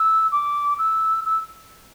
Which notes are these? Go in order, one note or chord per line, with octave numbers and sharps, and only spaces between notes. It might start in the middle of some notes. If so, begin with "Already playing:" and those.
Already playing: E6
D6
E6
E6